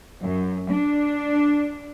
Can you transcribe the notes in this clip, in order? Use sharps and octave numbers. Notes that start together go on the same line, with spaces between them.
F#2
D4